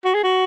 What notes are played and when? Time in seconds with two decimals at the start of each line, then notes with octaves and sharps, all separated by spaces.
0.05 F#4
0.14 G#4
0.24 F#4